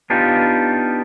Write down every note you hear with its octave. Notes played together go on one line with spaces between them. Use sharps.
B3 D4 D#4 F4 G4